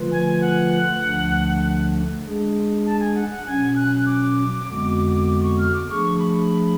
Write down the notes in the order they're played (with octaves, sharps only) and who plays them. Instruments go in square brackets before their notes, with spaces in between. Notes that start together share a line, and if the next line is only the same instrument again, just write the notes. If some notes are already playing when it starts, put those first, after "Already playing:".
Already playing: [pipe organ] D3 F3 A3 F4 B4
[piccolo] G#5
F#5
[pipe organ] D2 D3 F3 A3 D4
G#3 D4 G#4
[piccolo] A5
G#5
F#5
F#5
[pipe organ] B2 F#3 C#4 [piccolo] G#5
[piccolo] F#6
D6
[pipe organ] F2 D3 G#3 B3 F#4
[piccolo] D6
C#6
F6
D6
[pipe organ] F3 A3 D4 G#4 [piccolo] C#6
[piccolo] B5